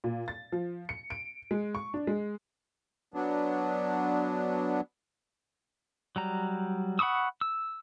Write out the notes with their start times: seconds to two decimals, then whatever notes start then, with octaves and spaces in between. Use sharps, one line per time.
0.04 A#2
0.28 A6
0.52 F3
0.89 C#7
1.10 D7
1.51 G#3
1.75 C#6
1.94 D4
2.07 G#3
3.14 F#3 B3 D4
6.16 F#3 G3 A#5
6.99 F#5 B5 C#6 D#6 E6
7.41 E6